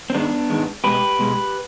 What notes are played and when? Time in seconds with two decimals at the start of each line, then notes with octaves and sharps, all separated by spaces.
0.10 C4
0.14 G#2 D#3 G#3 B3 D4
0.50 G#2 D#3 G#3
0.84 B2 G#3 G4 B4
1.19 B2 G#3